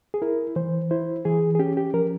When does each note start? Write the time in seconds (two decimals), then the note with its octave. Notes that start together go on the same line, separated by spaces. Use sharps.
0.14 G#4
0.22 E4 A#4
0.56 E3 C5
0.91 E4 C5
1.25 E3 G#4
1.55 G#4
1.59 C#4 G4
1.77 G4
1.94 F3 A#4